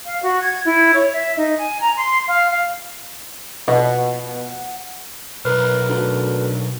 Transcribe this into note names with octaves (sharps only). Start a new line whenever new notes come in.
F5
F#4
G#6
E4
C#5
E5
D#4
G#5
A#5
C6
F5
F5
B2 F#5
B1 A#4 B4
D2